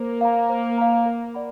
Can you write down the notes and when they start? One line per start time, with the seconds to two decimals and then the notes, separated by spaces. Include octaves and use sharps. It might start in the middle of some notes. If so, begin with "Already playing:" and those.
Already playing: A#3 C5
0.21 F5 A#5
0.50 C5
0.78 F5 A#5
1.06 A#4
1.34 D5 F#5 B5